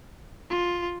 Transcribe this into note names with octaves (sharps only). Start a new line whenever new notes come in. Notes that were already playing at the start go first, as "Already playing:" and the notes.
F4